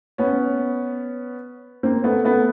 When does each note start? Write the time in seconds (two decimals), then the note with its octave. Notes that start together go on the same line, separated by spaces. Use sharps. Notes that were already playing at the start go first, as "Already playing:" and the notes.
0.18 B3 C#4
1.83 A#3 C4
2.04 A3 B3
2.24 A3 B3